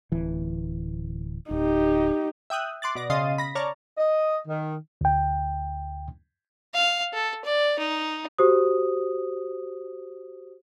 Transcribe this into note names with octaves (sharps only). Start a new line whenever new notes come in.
D1 E3
D1 D#4 G4
E5 G5 D#6 F#6
C6 D6 F#6 A6
B2 D5 A#6
C#3 D#5 F5 C6 A6 D#7
B5 A#6
C#5 D5 A5 A#5 F6 A6
D#5
D#3
D2 G5
F5
A4
D5
D#4
F#4 G4 C5 D#6